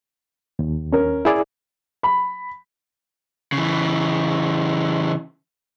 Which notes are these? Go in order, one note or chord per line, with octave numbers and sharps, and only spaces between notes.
D#2
C#4 A#4
E4 G#4 D5
B5
C#3 E3